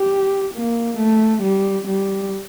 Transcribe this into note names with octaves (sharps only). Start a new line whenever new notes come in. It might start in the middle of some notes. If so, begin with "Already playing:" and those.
Already playing: G4
A#3
A3
G3
G3